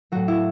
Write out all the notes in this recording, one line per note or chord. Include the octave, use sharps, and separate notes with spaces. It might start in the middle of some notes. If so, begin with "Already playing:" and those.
A2 F#3 F#4
E4